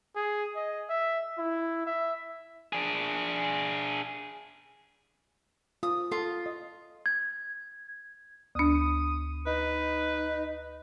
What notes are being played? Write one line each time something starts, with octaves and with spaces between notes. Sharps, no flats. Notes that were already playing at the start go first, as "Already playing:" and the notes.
G#4
D#5
E5
E4
E5
D4 G#4
F4 D#6
F4 A4
D#5
G#6
D2 D4 D#6
D#4 B4